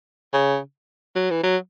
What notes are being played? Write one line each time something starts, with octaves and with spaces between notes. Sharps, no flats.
C#3
F#3
E3
F#3